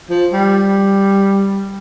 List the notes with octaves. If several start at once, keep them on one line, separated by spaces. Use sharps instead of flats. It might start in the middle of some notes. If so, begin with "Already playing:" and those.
F3
G3